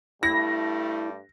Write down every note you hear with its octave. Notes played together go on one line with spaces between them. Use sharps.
G2 G3 A3 E4 A#6